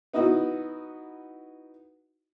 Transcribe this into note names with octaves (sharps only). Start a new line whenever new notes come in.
B3 D#4 E4 F#4